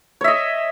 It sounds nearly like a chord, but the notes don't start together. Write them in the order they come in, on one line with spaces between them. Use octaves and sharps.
C#5 E5 D#5